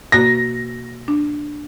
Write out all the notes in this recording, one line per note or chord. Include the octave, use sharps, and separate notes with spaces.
B2 A#3 F#4 A#6
D4